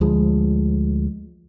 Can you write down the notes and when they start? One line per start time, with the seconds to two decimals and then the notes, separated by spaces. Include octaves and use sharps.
0.01 D2 F3 G#3